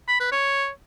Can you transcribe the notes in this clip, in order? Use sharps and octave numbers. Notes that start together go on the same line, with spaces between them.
B5
B4
C#5